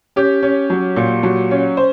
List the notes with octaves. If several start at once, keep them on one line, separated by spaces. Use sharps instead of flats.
C#4 G4
C#4
F#3
A#2
F#3
C#4
C5